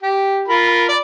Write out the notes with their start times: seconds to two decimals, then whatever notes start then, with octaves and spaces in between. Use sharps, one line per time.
0.03 G4
0.48 F4 A#4 B5
0.89 D5